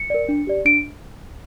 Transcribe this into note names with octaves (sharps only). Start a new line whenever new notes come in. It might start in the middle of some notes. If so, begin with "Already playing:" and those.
Already playing: C#7
A#4 D5
D4
G4 D5
D4 D7